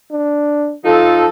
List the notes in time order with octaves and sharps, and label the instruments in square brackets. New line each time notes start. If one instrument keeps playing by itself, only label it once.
[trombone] D4
[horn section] F3 D#4 A4 [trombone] F4